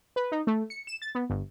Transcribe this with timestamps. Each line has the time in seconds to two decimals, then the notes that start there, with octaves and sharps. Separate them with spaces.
0.16 B4
0.32 D#4
0.47 A3
0.70 C#7
0.87 E7
1.02 A6
1.15 B3
1.30 G1